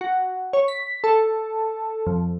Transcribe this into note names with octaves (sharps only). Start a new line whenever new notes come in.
F#4
C#5
B6
A4
F2